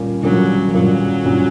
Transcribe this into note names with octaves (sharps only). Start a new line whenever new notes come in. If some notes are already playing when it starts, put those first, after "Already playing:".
Already playing: A#2 G3 A#3 C#4
A#2 F#3 G3 A#3 C#4
A#2 F#3 G3 A#3 C#4
A#2 G3 A#3 C#4